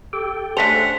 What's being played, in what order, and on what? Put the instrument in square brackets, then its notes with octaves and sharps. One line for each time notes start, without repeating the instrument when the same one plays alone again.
[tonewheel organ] G4 A4 G5
[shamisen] A3 C5 [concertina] C#4 D4 F#5 [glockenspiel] B6 F7